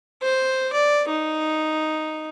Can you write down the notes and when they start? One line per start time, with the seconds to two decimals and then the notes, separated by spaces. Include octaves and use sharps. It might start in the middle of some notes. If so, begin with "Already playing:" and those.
0.22 C5
0.73 D5
1.08 D#4